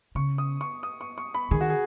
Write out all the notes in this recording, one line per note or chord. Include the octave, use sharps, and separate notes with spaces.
C#3 C#6
D#6
C#6
D#6
C#6
C#6
B5
D#3 G#4
F#4
G#4